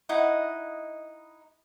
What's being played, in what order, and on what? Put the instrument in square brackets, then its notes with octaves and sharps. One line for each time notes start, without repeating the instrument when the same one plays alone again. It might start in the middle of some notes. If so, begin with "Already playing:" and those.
[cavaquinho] D#4 E4 D#5 F#5